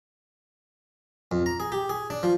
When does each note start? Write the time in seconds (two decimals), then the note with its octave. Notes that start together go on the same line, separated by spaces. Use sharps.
1.31 F2
1.46 A#5
1.60 G#4
1.72 G4
1.89 G#4
2.10 D4
2.23 F3